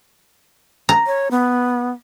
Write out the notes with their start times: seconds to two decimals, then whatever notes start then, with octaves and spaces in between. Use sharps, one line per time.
0.89 A#5
1.07 C#5
1.31 B3